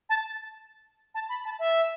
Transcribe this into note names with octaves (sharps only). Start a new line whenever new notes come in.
A5
A5
B5
A5
E5